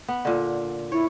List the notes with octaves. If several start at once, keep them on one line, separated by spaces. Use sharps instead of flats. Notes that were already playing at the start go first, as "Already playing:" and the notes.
B3
A#2 D3
E4 C#5